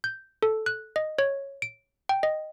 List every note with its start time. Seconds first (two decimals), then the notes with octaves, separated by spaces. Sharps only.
0.04 G6
0.43 A4
0.66 F#6
0.96 D#5
1.19 C#5
1.62 D7
2.09 G5
2.23 D#5